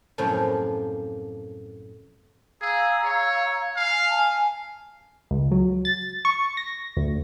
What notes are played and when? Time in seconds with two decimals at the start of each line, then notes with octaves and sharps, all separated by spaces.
0.18 F#2 A2 C3 F3 F#3 A#3
2.61 G#4 F5 A#5 E6
3.04 C#5
3.76 F5 G#5
4.09 G#5 A5
5.31 C#2
5.51 F#3
5.85 A6
6.25 C#6
6.57 A#6
6.97 D2